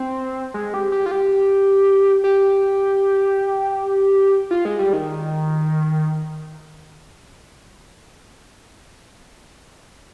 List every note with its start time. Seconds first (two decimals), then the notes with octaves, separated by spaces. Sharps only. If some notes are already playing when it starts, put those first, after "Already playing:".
Already playing: C4
0.54 G#3
0.74 G4
0.92 G4
1.06 F4
1.11 G4
2.24 G4
4.51 F4
4.65 G#3
4.79 G3
4.93 D#3